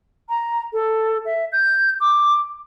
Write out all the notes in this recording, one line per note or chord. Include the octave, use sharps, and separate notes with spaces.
A#5
A4
E5
G6
D6